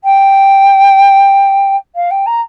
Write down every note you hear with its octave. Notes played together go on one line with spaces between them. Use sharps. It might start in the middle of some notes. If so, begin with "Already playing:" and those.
G5
F5
G5
A#5